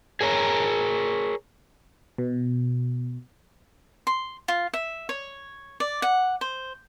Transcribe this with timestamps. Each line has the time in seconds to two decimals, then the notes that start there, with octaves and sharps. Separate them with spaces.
0.21 G#4 A#4 C#5 A#5
2.18 B2
4.07 C6
4.48 F4
4.73 E5
5.09 C#5
5.80 D5
6.02 F#5
6.41 C5